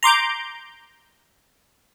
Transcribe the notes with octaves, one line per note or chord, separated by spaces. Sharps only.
A#5 C6 D6 G6